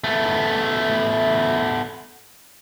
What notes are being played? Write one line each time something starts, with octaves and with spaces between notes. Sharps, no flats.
A3 B3